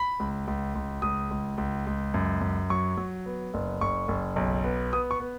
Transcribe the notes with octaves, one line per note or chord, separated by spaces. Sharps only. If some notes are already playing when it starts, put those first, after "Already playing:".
Already playing: B5
C#2
C#2
C#2
C#2 D#6
C#2
C#2
C#2
F#2
F#2
F#3 C#6
F#3
B3
F#1
F#1 C#6
F#1
B1
B3
B3 D#6
C#6
B3